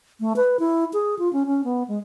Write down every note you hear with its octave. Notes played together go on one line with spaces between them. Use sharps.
A3
B4
E4
G#4
F4
C#4
C#4
B3
G#3